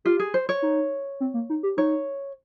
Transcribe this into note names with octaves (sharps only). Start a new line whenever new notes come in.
F4 G4
G#4
C5
C#5
D#4
C4
A#3
D#4
G4
D#4 C#5